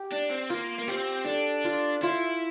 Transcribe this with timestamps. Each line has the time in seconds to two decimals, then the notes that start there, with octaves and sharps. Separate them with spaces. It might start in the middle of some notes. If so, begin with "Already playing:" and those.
Already playing: G4
0.12 D4
0.30 C4
0.50 A#3 F4
0.79 A#3
0.88 C4 G4
1.26 D4 A4
1.65 F4
2.02 E4 F4